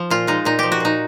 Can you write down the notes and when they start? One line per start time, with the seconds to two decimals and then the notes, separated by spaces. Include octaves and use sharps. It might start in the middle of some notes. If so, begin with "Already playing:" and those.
Already playing: F3
0.10 A#2 F4
0.27 G#3 D#4
0.45 A#2 D#4
0.59 F3 G4
0.72 F#4
0.80 A#2 D#4